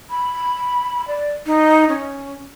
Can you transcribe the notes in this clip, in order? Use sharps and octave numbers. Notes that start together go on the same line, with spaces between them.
B5
D5
D#4
C#4